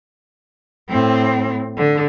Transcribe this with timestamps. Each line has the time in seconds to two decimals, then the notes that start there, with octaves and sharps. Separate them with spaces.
0.90 A2 C4
1.77 D3